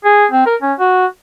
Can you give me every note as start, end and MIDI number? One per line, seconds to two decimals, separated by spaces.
0.04 0.26 68
0.31 0.46 60
0.46 0.56 70
0.62 0.73 61
0.79 1.06 66